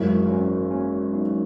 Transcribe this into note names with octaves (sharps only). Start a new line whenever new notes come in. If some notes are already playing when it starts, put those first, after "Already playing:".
Already playing: G#1 F#2 E3 F#4 A#4
C#4 E4
A#3 C#4
B3 D#4